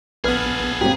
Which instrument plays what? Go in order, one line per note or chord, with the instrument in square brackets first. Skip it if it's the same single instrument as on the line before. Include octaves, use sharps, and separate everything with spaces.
[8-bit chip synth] A#1 B3 [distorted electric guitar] G#4 A4 [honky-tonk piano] B4 F6
[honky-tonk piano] F#2 F#3 [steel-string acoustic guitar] A#3 C4 G4 [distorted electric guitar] G#4